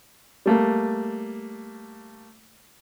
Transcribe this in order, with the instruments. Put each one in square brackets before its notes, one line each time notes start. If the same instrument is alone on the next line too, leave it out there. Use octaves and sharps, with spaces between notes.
[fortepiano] G3 A3 A#3